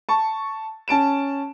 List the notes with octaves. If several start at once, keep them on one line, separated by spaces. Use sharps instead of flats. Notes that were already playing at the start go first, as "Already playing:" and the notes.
A5 C#6
C#4 A5 D7 E7